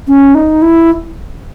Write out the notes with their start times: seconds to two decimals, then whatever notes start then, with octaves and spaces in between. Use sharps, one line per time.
0.08 C#4
0.35 D#4
0.62 E4